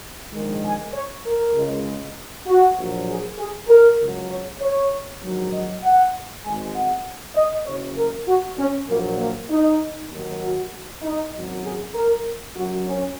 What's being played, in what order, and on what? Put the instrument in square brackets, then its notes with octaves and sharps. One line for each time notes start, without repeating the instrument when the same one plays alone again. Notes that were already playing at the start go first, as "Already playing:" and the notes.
[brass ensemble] A#1 G#2 D#3 G#3
G#5
C#5
A#4
C#2 C#3 G#3
F#4
A#1 A#2 F#3
G#4
G#4
A#4
C#2 C#3 F#3
C#5
C#5
A#1 G#2 D#3 F#3
D#5
F#5
G#1 G#2 G#3 G#5
F#5
D#5
F#1 F#2 C#3 C#5
A#4
F#4
C#4
A#1 A#2 F#3 A#3
A#3
D#4
D#2 D#3 F#3
F#4
D#4
G#1 F#2 F#3
G#4
A#4
F#2 F#3 F#4
C#4